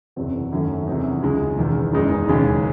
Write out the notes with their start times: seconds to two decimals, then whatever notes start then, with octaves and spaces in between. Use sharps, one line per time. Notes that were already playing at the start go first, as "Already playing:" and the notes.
0.16 F#1 E2 C3 F#3 C4
0.52 F#2 D#3 F#3 A3 C#4
0.87 E2 C3 F#3 C4 D#4
1.23 C#2 C#3 G#3
1.57 E1 E2 D#3
1.93 F#1 E2 C#3 G#3 D#4
2.28 E1 D#2 C#3 G#3 C#4